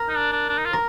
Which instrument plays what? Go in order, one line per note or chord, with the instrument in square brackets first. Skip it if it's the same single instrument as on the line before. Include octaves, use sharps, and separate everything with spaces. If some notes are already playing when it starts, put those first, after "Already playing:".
Already playing: [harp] A#4
[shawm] D#4
D4
D4
D4
D#4
F4
[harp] A#4